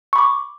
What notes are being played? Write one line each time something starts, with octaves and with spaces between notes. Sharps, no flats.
B5 C#6 D6